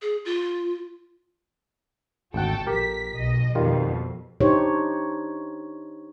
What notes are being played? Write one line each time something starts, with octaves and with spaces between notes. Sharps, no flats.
G#4
F4
G#1 D2 F#4 A4 F#5 G5
A#1 G4 A#4 B6
B1 D#5
F2 B2 D#3 G3 F4
D4 D#4 G4 C5 C#5